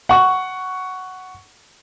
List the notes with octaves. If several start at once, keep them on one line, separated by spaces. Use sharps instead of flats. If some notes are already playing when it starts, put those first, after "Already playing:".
F#5 C#6